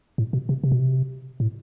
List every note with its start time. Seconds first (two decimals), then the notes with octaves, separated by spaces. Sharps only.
0.18 A2
0.33 B2
0.49 C3
0.64 C3
0.72 B2
0.80 C3
1.40 A2